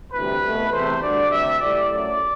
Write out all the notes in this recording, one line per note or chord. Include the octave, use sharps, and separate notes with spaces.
D2 C3 E3 G3 B4
C2 B2 A3
E2 C3 E3 A3 C5
D2 D3 G3 D5
D2 C3 G3 E5
A2 G3 D5
F#2 F#3 A3 D5